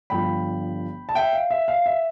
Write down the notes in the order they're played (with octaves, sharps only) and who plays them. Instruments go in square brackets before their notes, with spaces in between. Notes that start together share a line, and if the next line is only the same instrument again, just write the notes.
[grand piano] G1 G2 F3 G5 B5
A5
E5 G5
F5
E5
F5
E5